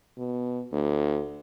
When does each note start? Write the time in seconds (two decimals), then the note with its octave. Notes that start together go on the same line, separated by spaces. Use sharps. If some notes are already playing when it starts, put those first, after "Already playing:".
0.18 B2
0.73 D2